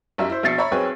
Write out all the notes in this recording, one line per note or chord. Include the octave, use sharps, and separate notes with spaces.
B1 F#2 G3 E5
E4 C5
A#1 B2 E5 A6 C7 C#7
C#5 E5 A#5 B5 C#6
B1 C4 G#4 B4 C#5 G#5